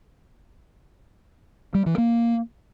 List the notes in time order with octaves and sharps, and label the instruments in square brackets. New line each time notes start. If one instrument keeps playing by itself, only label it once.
[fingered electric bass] G3
E3
A#3